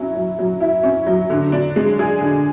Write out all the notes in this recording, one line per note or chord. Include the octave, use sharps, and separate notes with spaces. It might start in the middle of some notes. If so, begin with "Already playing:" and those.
Already playing: F#3 C#4 E4
F#3
F#3
E4
C#4
F#3
D3
D4
G#3
G#4
D3